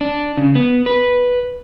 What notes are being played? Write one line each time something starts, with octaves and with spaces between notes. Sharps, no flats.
D4
C#3
B3
B4